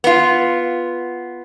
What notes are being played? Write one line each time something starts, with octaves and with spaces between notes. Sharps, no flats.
B3 F4